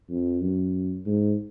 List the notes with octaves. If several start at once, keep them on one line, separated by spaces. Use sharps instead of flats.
F2
F#2
G#2